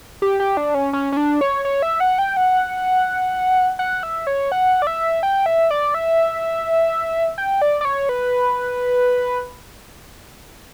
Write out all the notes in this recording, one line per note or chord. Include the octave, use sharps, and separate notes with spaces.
G4
G4
D4
C#4
C#4
C#4
D4
C#5
C#5
E5
F#5
G5
F#5
F#5
E5
C#5
F#5
D5
E5
G5
E5
D5
E5
G5
D5
D5
C#5
B4